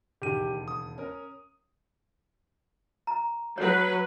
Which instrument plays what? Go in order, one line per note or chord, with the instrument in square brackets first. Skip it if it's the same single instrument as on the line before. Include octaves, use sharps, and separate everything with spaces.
[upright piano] E1 D#2 C#3 [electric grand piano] G4 D#7
[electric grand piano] D#6
[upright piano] C#4 A#4
[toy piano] A#5
[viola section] F#3 B4 [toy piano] C#5